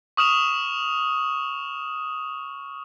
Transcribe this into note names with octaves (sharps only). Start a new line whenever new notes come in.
C#6 D#6 F6 E7 F7